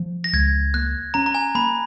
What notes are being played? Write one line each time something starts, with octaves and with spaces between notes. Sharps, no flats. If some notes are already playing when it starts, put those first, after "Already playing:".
Already playing: F3
A#6
C#2 G#6
A#3 F#6
C#4 A#5
A#5
G#5
A#3 B5